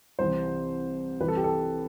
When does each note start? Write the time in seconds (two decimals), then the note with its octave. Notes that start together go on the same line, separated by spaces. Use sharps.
0.19 C2 C3 E3 C5
1.20 C2 C3 E3 B4
1.28 A4
1.37 G4
1.44 A4